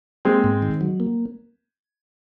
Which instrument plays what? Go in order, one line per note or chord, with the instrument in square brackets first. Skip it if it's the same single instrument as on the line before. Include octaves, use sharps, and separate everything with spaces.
[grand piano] G#3 C4 [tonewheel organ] A#3
[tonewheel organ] G#2
D#3
F#3
A#3